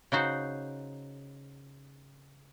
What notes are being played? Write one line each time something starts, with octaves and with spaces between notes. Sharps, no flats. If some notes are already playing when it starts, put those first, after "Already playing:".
C#3 D#4 F#4 C5